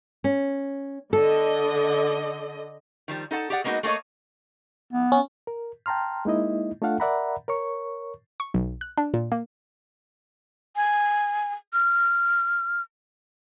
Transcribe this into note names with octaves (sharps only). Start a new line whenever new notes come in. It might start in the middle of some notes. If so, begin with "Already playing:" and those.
C#4
D3 A4 D#5
D#3 F3 G3
D#4 A4 F#5 A5
G4 G#4 D5 F#5
G#3 A#3 B3 C#4 D#4 F#4
A3 A#3 G4 C#5 D#5
B3
C#4
A#4
G5 A5 A#5 C6 F6
G#3 A#3 D#4 E4 D#5
A3 D4 F4 A4 F5 F#5
A#4 D5 E5 F#5 A#5 B5
A#4 C#5 C#6
C#6
B1
F#6
D4
A#2
A#3
G#5
F6